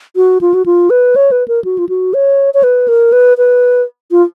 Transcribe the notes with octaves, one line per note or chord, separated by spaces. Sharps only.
F#4
F4
F#4
F4
B4
C#5
B4
A#4
F#4
F4
F#4
C#5
C#5
B4
A#4
B4
B4
F4